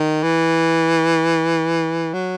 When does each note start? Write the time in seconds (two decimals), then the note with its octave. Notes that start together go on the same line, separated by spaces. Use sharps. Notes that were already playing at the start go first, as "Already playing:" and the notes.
Already playing: D#3
0.23 E3
2.13 F#3